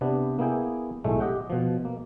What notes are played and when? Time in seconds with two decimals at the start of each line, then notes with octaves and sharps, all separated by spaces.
0.01 C3 B3 D4
0.39 A#3 B3 E4 G#4 G5
1.04 B1 A2 G#3 A3
1.20 G4 D#5 F#5 G5
1.50 B2 F3
1.85 A#3